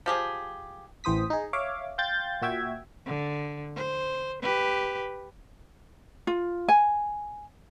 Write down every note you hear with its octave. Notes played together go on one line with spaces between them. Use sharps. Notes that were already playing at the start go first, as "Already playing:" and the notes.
F3 G4 G#4
A1 E3 C5 D#6 B6
D#4 G#4
C#5 E5 F5 D6
F5 G5 C6 G6 A6
A#2 F#4 E5 G5 G#6
D3
C5
G4 B4
F4
G#5